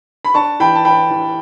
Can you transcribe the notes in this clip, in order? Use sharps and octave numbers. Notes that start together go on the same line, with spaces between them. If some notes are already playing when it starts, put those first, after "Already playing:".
B5
D4 A5 C#6
E3 G5 B5
A5
E3 G5 B5
E3